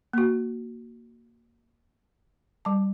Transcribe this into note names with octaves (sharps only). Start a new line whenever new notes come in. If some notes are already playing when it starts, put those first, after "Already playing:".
A#3 F#4
G3 A5